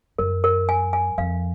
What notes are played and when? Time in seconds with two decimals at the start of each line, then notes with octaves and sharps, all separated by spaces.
0.18 F#2 A#4
0.44 A#4
0.69 G#5
0.93 G#5
1.18 F2 F5